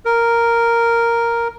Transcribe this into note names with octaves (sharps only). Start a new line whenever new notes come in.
A#4